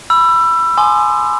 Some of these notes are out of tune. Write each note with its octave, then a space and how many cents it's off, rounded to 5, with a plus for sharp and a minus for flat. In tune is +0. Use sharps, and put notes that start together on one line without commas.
B5 +0 E6 +25
G#5 +15 C6 +0 D#6 -45